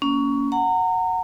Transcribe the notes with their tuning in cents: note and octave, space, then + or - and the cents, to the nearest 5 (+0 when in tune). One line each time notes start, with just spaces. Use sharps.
A#3 +0 C#4 +20
F#5 +0 A#5 -30